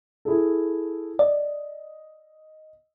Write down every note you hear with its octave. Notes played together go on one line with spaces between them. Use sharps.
E4 G#4 A4
D5 D#5